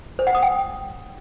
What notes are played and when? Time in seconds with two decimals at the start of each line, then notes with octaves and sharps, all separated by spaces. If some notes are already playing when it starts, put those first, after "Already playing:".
0.19 C5
0.27 F#5
0.35 D#6
0.42 G5